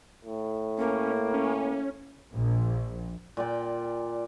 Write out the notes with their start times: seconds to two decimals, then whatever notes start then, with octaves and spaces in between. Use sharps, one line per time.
0.24 A2
0.78 A#3 C#4
1.34 C#4
2.34 A#1
3.37 A#2 D5 G5